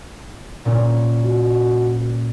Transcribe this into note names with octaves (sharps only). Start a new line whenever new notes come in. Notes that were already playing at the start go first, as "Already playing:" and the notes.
A#2 C#4
F#4